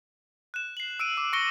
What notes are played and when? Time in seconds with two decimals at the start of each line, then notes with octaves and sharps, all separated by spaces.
0.54 F#6 E7
0.77 C7 F#7
1.00 E6 D7 D#7
1.17 D6
1.33 C#6 E6 A#6 C#7 D7 G7